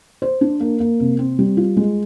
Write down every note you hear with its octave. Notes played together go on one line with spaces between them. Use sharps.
C5
D4
A#3
A#3
C3
C4
G3
F4
G#3